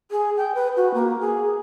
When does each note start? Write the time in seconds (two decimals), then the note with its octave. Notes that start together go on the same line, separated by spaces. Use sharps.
0.11 G#4
0.37 G5
0.55 B4
0.77 F#4
0.94 A#3
1.21 G#4